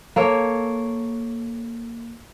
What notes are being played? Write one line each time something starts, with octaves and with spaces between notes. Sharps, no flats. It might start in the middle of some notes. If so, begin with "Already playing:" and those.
A#3 A4 C#5